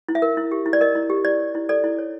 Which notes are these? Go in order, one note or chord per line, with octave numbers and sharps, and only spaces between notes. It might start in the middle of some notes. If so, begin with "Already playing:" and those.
E4
E5
A#4
E4
G4
E4
D5
A#4 D#5
E4
G4
E4 D5
C#5
E4
A4 D5
E4
C#5